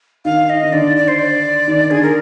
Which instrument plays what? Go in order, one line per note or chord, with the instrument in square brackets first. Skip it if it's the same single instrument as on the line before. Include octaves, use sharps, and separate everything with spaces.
[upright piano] D#3 [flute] F5
[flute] D#5
[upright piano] D#3
[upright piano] D3 [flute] D5
[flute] D5
C5
D5
[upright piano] D#3
[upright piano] D3 [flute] G#4
[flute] A#4